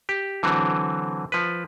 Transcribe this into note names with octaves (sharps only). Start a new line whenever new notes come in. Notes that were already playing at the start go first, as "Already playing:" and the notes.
G4
D3 E3 F#3 C4
F3 B4